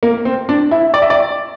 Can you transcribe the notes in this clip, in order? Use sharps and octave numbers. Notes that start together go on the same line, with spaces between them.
A#3
C4
D4
E4
D5
E5
D5